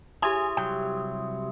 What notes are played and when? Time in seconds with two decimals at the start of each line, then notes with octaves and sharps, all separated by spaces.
0.22 E4 G4 G#4 C#5 G#5 C6 D#6
0.57 C2 F#3 G5